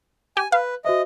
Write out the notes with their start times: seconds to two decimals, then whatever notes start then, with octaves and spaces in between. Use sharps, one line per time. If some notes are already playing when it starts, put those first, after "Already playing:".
0.37 G4 G#5
0.52 B4 F5
0.85 F#4 C5 D#5 E5